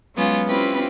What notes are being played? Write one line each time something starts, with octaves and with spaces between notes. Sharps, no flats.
F#3 G#3 B3 C#4 F4
C4 C#4 E4 F4 G4 B4